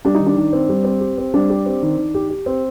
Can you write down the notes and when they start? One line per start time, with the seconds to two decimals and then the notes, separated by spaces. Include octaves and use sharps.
0.05 G3 D4
0.15 D#4
0.20 D#3
0.26 D4
0.37 D#3
0.53 C4
0.69 G3
0.84 C4
1.00 G4
1.18 C4
1.34 G3 D4
1.50 G4
1.66 C4
1.82 D#3
1.97 D#3
2.14 G4
2.30 G4
2.46 C4